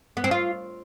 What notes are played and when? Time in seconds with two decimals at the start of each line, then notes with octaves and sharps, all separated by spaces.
0.17 B3
0.24 C4
0.31 F4